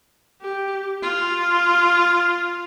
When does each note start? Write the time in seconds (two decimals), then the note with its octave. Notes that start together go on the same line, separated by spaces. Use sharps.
0.41 G4
1.02 F4